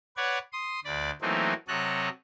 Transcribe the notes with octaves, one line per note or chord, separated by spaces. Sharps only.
B4 C#5 D5 F#5 G#6
C6 D#6
D2 D5 B5
E3 F#3 A3 A#3 C4 D#4
C3 F#3 A4 C#5 D#5 F#6